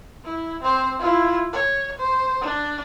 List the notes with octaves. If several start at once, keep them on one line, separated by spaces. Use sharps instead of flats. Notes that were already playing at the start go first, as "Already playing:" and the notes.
E4
C4 C5
E4 F4
C#5
C5
D4